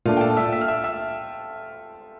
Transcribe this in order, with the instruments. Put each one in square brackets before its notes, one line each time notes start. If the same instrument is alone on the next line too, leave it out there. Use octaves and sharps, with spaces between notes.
[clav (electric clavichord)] A#2 A3 D4 [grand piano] F4 F5
[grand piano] G5
A4 A5
E5 E6
E5 E6
F6
E5 E6
E5 E6